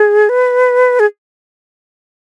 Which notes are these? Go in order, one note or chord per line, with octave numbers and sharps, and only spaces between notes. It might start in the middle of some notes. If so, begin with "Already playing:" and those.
Already playing: G#4
B4
G#4